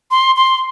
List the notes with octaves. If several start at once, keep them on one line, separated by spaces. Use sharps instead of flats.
C6
C6